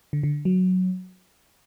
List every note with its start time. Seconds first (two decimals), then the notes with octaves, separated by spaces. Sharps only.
0.13 D3
0.23 D3
0.45 F#3